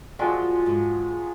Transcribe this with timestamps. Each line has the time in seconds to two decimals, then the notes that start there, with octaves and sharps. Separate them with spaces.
0.19 F3 F#3 G#3 D5
0.66 G#2